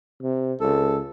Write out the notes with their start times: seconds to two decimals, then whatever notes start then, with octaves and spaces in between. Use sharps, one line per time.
0.21 C3
0.61 C#2 A4